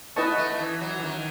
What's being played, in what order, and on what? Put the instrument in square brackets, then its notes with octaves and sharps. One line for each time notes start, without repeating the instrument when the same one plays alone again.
[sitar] B3 [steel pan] E4 B4 D#5 A5 C#6
[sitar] A3
E3
F#3
E3
D#3